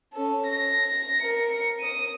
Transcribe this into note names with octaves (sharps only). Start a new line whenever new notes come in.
C#4 A4
A#6
A#4 C#7
D#6 D#7